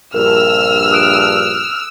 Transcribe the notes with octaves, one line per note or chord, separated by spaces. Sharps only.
A#1 G2 A#4 E6 F6
D#6 F#6 D7